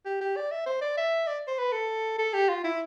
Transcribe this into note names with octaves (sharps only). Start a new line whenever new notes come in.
G4
G4
D5
E5
C5
D5
E5
D5
C5
B4
A4
A4
G4
F4
E4